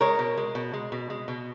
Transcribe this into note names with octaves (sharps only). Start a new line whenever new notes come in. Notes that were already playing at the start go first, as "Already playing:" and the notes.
G#3 A#4 C#5
B2
G#3
B2
G#3
B2
G#3
B2